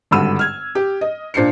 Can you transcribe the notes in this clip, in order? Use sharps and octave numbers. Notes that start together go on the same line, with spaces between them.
G#1 G2 D3 B5 E6 D#7
F6 G#6
G4
D#5
A#2 D4 C5 C7 C#7